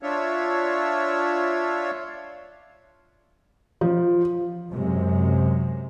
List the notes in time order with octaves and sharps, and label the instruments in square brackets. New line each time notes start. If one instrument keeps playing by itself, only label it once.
[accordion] D4 F4 C#5 E5
[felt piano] F3
[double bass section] F#2 C3 G#3